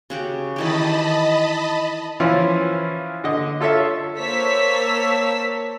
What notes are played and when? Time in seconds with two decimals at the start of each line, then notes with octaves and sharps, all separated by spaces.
0.10 C#3 F#4 G4
0.56 D#3 E3 G4 D#5 A5 B5
2.20 E3 F3 C#4 F4
3.24 D3 D#5
3.61 F4 A4 C#5 E5 F5
4.16 A#3 C5 C#5 A5 E6 B6